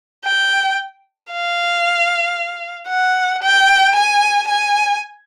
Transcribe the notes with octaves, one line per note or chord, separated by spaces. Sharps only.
G5
F5
F#5
G5
G#5
G#5